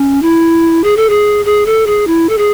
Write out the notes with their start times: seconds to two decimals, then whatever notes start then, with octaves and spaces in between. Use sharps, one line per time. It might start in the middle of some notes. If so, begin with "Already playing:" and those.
Already playing: C#4
0.22 E4
0.84 G#4
0.97 A4
1.10 G#4
1.45 G#4
1.66 A4
1.87 G#4
2.07 E4
2.29 A4
2.38 G#4